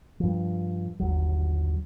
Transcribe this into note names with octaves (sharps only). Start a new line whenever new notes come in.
G2 F3
G1 D#2 F#3